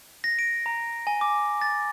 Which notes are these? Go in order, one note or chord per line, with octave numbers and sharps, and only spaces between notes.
A#6
D7
A#5
G#5
D6
A6